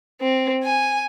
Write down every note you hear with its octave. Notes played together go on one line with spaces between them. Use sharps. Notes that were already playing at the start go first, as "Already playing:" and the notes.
C4
G#5